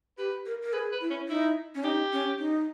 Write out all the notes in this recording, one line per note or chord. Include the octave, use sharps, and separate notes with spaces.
G4 B4
A#4
A#4
G#4 B4
B4
E4
C#4
D#4 E4
C#4
D#4 G4
C#4
D#4